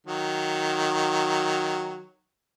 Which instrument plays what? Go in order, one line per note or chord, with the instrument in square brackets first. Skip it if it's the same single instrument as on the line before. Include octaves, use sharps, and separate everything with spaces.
[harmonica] D#3 F#3